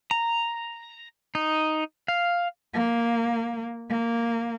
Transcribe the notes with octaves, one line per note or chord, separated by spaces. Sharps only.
A#5
D#4
F5
A#3
A#3